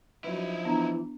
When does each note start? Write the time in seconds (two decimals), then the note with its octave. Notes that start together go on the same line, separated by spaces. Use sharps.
0.24 F3 F#3 D#4 E4 B4
0.65 E3 B3 D4 A#5